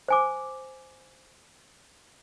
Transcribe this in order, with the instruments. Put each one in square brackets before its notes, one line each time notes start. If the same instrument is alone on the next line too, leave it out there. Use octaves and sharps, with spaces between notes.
[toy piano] C5 G#5 D6